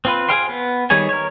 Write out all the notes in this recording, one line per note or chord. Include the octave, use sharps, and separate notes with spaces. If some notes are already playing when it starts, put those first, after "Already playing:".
C4 F4 B4
G#4 C5 F5 G5 C6
B3
D#3 G3 G#4 C#5 G#5
A#4 C#5